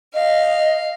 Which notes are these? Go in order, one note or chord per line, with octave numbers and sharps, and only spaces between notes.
D#5 F5